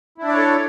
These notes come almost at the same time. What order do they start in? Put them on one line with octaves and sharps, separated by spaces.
E4 D4 D5 C#5 A4